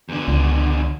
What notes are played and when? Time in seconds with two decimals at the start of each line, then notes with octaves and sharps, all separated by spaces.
0.09 E2 D3
0.28 C#2